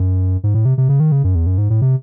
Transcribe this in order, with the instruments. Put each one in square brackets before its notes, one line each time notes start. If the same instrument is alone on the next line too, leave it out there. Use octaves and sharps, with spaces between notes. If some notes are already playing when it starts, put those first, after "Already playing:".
Already playing: [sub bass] F#2
G#2
A2
C3
C3
C#3
D#3
C#3
F#2
E2
F#2
G#2
A2
C3